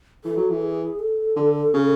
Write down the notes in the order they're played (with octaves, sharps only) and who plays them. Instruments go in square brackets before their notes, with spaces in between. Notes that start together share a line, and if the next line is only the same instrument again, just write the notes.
[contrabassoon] E3 [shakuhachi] A4
[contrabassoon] F#3
E3
[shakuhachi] G#4
A4
[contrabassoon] D3
C#3